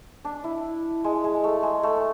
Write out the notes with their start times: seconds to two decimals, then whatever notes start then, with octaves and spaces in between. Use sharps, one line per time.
0.25 D4
0.44 E4
1.04 G#3
1.24 G#3
1.44 A3
1.63 G#3
1.83 A3